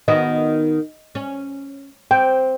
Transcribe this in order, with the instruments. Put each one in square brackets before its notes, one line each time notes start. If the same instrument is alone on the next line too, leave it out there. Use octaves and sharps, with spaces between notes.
[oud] D#3 B3 F#4 [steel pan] D#5
[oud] C#4
[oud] C4 [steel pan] G5